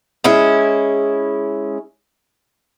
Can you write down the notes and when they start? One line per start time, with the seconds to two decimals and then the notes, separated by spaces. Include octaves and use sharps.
0.24 G#3 C#4 E4